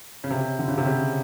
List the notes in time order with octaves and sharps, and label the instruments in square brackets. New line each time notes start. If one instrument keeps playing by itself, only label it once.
[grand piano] C#3
C3
D3
C#3
C3
C#3